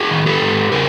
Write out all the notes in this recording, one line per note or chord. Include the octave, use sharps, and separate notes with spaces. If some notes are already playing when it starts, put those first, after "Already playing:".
Already playing: F#4 G#4
D#3
G4 A4
G#2
C#3 G#4 A#4